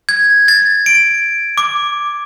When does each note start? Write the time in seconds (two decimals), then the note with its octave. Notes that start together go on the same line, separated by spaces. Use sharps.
0.09 G#6
0.48 A6
0.86 D7
1.58 D6